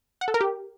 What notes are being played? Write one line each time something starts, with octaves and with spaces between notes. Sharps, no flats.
F#5
A4
A#4
G4